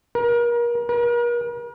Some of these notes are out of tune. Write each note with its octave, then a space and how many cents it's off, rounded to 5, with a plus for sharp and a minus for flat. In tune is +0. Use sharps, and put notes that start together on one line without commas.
A#4 +35
A#4 +45